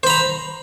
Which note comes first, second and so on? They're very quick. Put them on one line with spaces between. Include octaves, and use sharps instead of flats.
C5 B5 A#5